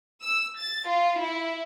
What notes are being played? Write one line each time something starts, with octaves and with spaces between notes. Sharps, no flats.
E6
A6
F4
E4